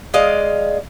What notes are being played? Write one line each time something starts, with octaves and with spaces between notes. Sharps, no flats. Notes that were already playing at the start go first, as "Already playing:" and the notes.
G#3 D5 D#5 F5